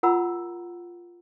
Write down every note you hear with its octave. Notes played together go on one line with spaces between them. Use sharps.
F4 A#4 F#5 A#5 B5 E6